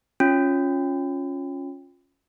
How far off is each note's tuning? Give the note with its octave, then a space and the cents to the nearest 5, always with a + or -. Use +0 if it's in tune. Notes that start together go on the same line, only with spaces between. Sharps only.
C#4 +0 F4 +15